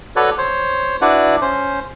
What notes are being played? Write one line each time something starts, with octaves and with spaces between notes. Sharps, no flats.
F#4 A4 B4 C#5 D5
C5 C#5
D4 E4 F#4 B4 D5 F#5
C#4 C5